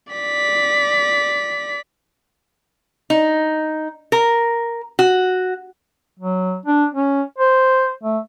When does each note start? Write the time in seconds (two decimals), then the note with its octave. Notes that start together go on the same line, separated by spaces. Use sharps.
0.13 D5 B6
3.10 D#4
4.12 A#4
4.99 F#4
6.19 F#3
6.65 D4
6.94 C#4
7.38 C5
8.03 A3